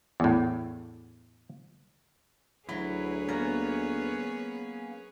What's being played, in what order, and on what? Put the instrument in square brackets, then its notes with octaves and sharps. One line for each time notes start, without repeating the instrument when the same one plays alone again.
[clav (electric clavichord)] E2 A2
[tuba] D2 [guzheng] F#3 [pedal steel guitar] E4 [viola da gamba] G#4 B4 C#5
[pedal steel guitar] A#3 B3 C#4 [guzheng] A#4